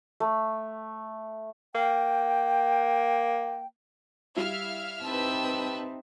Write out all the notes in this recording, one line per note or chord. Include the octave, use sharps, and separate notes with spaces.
A3
A#3 G5
G3 E4 E5 F5 F6
C4 D#4 G4 B4 E5 A5 E6